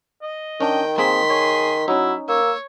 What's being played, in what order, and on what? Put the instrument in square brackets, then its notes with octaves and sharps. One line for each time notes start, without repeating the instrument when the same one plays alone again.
[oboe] D#5
[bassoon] D#3 [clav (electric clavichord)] C#4 D4 [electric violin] G5
[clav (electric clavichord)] A#3 C4 G#4 [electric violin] C6 B6
[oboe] G#4 [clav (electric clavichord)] C#5
[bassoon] F#3 [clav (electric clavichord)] C#4 D#4 [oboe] E4
[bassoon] A#3 [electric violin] C#5 [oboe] E6